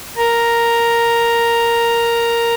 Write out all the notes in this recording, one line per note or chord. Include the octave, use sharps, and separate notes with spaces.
A#4 A#5